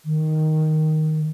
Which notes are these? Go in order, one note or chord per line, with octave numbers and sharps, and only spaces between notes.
D#3